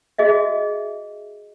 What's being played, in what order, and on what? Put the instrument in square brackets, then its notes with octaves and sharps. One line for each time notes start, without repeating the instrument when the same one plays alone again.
[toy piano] F#4 G#4 D#5 E5